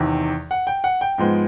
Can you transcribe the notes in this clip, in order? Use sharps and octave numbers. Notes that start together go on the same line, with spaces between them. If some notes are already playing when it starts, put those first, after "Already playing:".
Already playing: E2 C3 D#3
F#5
G5
F#5
G5
G#2 F3 G#3 B3